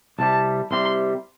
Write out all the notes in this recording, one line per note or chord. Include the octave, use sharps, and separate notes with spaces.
C2 C3 G3 A5
C2 C3 G3 C6